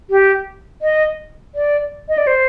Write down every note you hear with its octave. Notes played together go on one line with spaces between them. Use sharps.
G4
D#5
D5
D#5
D5
C5